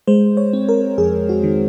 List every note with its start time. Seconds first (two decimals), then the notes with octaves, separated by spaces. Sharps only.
0.07 G#3 C5
0.37 C#5
0.53 C4
0.69 A#4
0.98 F2 G#4
1.29 F#4
1.44 D#3